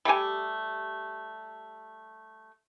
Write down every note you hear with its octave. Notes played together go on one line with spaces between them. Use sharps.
G3 A3 G4 G#5